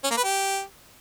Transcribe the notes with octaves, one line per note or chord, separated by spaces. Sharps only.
C#4
A#3
B4
G4